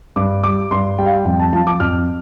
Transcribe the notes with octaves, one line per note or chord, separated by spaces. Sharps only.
G2 D6
G3 D6
G2 C6
G3 G5
F5
G5
F2 G5
A5
F3 A5
D6
F2 F6